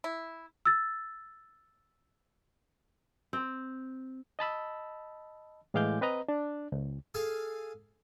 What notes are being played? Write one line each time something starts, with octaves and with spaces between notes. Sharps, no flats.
E4
E6 A6
C4
D#5 A5 B5 E6
A2 E3 G#3 F5 D6 G6
C4 B4 D#5 A#5
D4
C#2
G#4 A4 F5 G#5